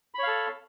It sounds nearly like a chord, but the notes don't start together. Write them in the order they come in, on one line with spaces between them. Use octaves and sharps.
B5 C#5 F5 A4